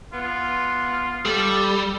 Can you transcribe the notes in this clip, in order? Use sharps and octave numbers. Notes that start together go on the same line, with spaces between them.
B3 F4
G3 A4